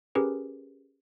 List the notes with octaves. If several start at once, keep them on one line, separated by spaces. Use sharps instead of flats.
C#4 G4 G#4 A#4 B4